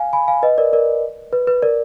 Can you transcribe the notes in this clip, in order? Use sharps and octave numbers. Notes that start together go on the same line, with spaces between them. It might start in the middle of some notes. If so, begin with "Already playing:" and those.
Already playing: F5 G#5
G#5 B5
F5 G#5
B4 D#5
A#4 D5
A#4 D5
B4
B4
A#4 D5